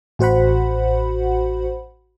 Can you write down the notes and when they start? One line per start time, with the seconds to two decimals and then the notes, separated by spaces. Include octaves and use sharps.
0.19 A1 F#4 C5 F#5 B5